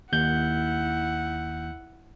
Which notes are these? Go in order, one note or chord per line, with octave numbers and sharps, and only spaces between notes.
D#2 E4 F#5 G6